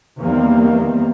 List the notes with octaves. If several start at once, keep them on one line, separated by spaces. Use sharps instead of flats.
E2 D#3 G3 A#3 C4